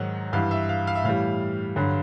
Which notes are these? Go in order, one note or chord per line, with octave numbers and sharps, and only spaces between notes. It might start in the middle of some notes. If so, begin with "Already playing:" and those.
Already playing: G#2 D#3 F#3 F#5
G2 E3 G3 F5
E5
F5
F5
E5
A2 E3 G3 F5
G2 D3 F#3